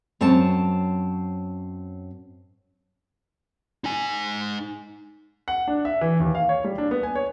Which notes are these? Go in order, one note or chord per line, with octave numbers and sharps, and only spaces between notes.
F#2 C4 C#5 A5
D#4 G#5
F#5
D4
E5
E3
D#2
F5
C#5
G3
D4
B3
G#5
C#5